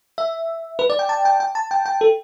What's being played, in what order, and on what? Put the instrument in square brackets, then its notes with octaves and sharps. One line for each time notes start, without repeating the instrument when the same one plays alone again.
[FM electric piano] E5
B4
D5
G5
A5
G5
G5
A5
G5
G5
A4